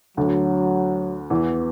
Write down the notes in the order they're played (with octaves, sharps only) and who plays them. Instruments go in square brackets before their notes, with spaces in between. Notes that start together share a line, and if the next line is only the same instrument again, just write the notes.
[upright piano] D2 D3 [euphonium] F#3
[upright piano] E2 E3 [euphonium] B3